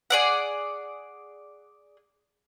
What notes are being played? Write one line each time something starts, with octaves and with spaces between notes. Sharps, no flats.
G#4 D5 F#5